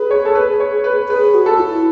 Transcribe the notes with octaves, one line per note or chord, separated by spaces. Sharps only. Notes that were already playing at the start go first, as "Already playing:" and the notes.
Already playing: G#4 B4
C#5
A4
B4
C#5
B4
G#4 B4
F#4
A4
E4